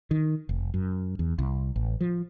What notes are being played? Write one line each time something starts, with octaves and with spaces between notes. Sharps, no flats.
D#3
F1
F#2
E2
C2
A1
F3